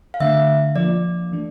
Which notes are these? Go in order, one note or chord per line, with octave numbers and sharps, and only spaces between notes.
F5
D3 A3 D4 E5
F3 A#3 D4 F4 D5
E3 A3 D4